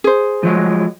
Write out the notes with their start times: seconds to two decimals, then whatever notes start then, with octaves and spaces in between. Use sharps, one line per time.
0.04 G#4 C5
0.43 F3 F#3 G#3